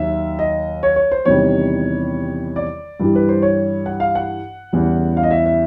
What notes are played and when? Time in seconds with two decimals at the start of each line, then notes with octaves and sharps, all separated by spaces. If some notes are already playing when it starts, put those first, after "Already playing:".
Already playing: D#2 D#3 F#3 E5
0.39 D#5
0.83 C#5
0.96 C#5
1.12 C5
1.25 E2 C3 D#3 G3 C#5
2.56 D5
3.00 G2 E3 G3
3.15 B4
3.29 C5
3.42 C#5
3.86 F#5
4.00 F5
4.15 F#5
4.73 E2 C#3 E3 G3
5.17 F5
5.23 D#5
5.31 E5
5.46 E5